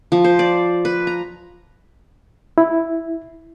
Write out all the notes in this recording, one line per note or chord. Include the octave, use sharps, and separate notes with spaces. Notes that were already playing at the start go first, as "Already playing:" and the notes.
F3
C5
D5
B4
A#5
E4